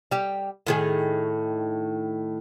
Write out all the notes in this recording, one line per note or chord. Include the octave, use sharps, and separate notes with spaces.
G3 G4
A2 D#3 G#4